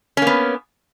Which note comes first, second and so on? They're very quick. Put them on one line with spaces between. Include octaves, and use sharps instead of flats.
C#4 A#3 B3